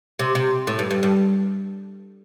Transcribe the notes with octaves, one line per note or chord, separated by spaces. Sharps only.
C3
C3
A2
G2
G2
G2